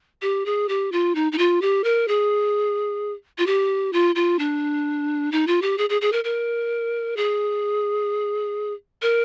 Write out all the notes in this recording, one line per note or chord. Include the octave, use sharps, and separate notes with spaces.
G4
G#4
G4
F4
D#4
D#4
F4
G4
A#4
G#4
F4
G4
F4
F4
D4
D#4
F4
G4
G#4
G#4
G#4
A#4
A#4
G#4
A#4